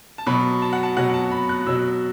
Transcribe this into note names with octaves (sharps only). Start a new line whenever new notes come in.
A5
B2 F#3 B5
A5
F#5
A5
B2 F#3 F#5
A5
B5
F#6
B2 F#3 E6